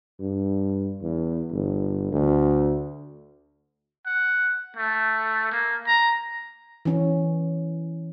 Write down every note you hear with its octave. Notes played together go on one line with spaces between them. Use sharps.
G2
E2
G1
D2
F#5
A3
A#3
A#5
E3 C#4